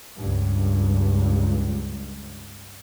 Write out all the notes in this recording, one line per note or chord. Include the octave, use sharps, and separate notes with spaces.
C#2 G2